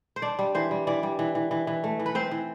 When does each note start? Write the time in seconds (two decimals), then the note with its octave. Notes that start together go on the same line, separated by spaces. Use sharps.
0.16 C5
0.22 D4 D5
0.39 G3
0.55 E3 C5
0.71 G3
0.87 E3 D5
1.03 G3
1.19 E3
1.35 E3
1.51 E3
1.67 E3
1.84 A3
2.00 E3
2.06 B4
2.15 C4 C5
2.31 E3